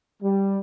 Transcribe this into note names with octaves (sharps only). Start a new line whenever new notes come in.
G3